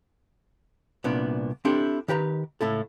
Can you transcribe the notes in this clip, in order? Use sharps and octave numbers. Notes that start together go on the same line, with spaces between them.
C2 A#2 B3 D4
C4 D4 E4 G4 A4
D#3 G4 B4 A#5
C#2 A2 E4 A4